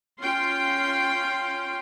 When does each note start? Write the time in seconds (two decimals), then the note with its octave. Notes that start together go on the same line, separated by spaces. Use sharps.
0.20 C#4 F4 G5 C6